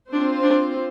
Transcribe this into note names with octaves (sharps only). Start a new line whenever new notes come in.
C4 D4 F4 C5
D4